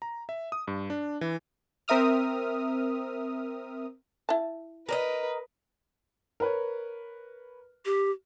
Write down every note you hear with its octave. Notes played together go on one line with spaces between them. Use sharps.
A#5
E5
D#6
G2
D4
E3
C4 A#4 E5 D#6 F6
E4 A5
A#4 B4 D5 D#5
A#4 B4 C#5
G4